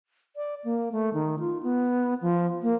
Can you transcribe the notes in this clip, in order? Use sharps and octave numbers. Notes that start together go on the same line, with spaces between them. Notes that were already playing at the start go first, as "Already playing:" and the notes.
D5
A#3
A3
D#3
F4
B3
F3
A#3